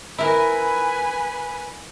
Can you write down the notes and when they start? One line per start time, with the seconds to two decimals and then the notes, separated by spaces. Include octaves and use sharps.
0.18 E4 A#4 B4 G#5